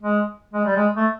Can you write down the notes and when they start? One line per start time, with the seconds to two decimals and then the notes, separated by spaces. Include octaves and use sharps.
0.03 G#3
0.54 G#3
0.65 G3
0.76 G#3
0.96 A3